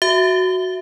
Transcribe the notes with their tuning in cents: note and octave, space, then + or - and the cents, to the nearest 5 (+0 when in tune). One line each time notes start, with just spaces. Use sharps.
F#4 +0 E5 +0